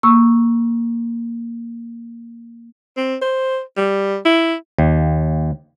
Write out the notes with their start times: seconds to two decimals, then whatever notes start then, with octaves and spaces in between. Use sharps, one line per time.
0.03 A#3 C#6 E6
2.97 C4
3.21 C5
3.77 G3
4.25 E4
4.78 D#2